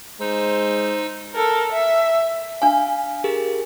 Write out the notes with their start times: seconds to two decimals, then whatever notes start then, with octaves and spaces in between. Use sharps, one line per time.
0.21 G#3 D#4 C5 E6
1.34 A4 A#4
1.72 E5
2.62 D4 F5 G#5
3.24 G4 G#4 A#4